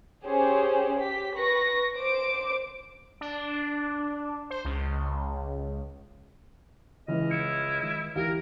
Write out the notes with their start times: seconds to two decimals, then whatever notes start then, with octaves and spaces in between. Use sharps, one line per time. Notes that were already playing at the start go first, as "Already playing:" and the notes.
0.25 C#4 G4 G#4 C5
0.99 G4 B6
1.36 B4 C#6 A#6
1.98 C5 D6 D7
3.21 D4
4.50 C5
4.65 C#2
7.08 C#2 C#3 E3 F3 G#3 D#5 F6
7.31 E4 C#7
7.83 D#3 G#3
8.16 D2 E3 D#4 G4 A#4 F5